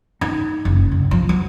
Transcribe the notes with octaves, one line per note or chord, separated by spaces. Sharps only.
D#4
F#1
F1
F3
F#3